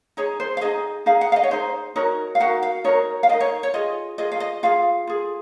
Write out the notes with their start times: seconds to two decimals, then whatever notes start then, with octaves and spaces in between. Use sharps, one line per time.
0.17 D#4 G#4 C#5
0.40 C5
0.57 F5
0.61 D#4 G#4 D#5
1.06 D#4 G#4 F5
1.21 F#5
1.32 F5
1.36 D#5
1.43 C#5
1.50 D#4 G#4 C5
1.96 D#4 F#4 A#4 C#5
2.35 F5
2.40 D#4 F#4 A#4 F#5
2.63 F5
2.84 D#4 F#4 A#4 C#5
3.23 F5
3.29 D#4 F#4 A#4 D#5
3.40 C#5
3.63 C#5
3.74 F4 G#4 D#5
4.18 F4 G#4 D#5
4.32 F5
4.40 D#5
4.63 F4 G#4 F5
5.07 F4 G#4